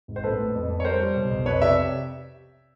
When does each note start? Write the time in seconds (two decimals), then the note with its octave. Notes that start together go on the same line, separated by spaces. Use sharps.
0.08 G#1
0.16 C5
0.23 A#1 A4 B4
0.38 A2
0.54 F2
0.70 F2
0.80 C#5
0.85 G3 A#4 C5
1.01 G3
1.16 B1
1.31 B1
1.46 F2 B4 C#5
1.61 C3 D5 E5